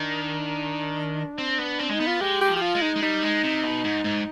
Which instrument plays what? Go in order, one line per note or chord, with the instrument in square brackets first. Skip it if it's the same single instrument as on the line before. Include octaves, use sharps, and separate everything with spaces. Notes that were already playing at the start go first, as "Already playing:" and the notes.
Already playing: [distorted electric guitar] D#3 [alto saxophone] D4
[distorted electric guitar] C4
B3
C4
[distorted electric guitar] G#3 [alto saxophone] D#4
[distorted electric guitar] B3
[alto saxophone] F4
[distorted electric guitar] G#3 [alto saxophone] G4
[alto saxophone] G4
[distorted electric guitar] F3
[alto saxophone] G4
F4
[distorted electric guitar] G#3
[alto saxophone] D#4
[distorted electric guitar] G#3
[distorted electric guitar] G3 [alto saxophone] D#4
[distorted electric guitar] G#3
C3
B2
G#2
G#2